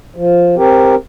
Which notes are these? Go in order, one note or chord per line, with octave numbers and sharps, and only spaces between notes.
F3
C4 G4 A#4